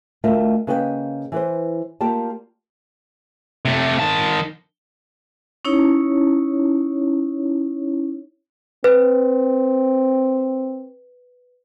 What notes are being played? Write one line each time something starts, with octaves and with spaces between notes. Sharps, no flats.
D2 A3 F4 A#4 D#5 E5
C#3 A#3 B4 D#5 E5 G5
E3 B4 C5
A#3 F4 G4 D5 G5 A5
C3 A3
D#3 A5
C#4 D#4 E4 C#5
C4 B4